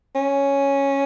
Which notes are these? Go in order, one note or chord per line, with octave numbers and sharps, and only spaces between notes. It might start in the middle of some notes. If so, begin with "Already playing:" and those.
C#4